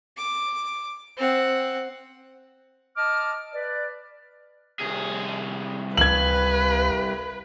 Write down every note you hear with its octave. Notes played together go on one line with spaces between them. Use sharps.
D6
C4 F#5
D#5 A5 D6 F6
B4 D5
C2 G#4
C#2 B4 F5 G#6 F#7